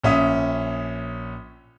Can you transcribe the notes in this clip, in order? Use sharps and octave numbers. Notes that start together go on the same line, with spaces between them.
A#1 C#4 E5 D#6